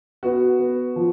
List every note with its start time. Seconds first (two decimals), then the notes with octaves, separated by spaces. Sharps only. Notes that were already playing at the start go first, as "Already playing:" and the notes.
0.23 B3 F#4
0.59 B3
0.96 F3